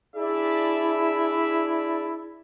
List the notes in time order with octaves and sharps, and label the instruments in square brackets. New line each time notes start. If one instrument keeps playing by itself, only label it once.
[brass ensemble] D4 D5 E5 [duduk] E4 [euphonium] G#4